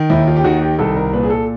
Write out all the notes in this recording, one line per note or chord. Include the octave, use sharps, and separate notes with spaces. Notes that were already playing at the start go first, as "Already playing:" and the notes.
Already playing: D#3
D#2 E4
F4
G4
D#3 F#4
G4
C2 A4
A#4
A#2 B4
G#4
A4